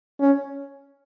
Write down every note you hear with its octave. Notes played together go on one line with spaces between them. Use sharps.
C#4